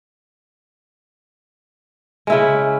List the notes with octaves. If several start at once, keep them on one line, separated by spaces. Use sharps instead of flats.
C#3 G#3 E4